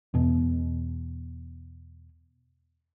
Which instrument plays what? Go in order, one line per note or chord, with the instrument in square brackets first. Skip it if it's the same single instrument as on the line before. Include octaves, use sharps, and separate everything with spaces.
[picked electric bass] E2 B2